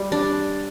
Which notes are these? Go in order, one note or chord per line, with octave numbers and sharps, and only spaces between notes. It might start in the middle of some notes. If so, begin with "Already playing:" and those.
Already playing: G3
D4